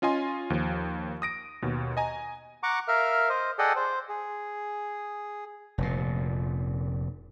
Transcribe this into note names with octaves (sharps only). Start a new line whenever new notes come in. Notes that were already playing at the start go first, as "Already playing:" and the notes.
C#4 F4 D#5 G#5 C6
D#2 F3
D#6 A#6 D7
D#2 B2
D#5 G#5 A#5
F#5 A#5 C#6 D6
A#4 E5 F5 F6
C5 D#5
G#4 A4 D5 D#5 F#5 G5
C5
G#4
F1 A#2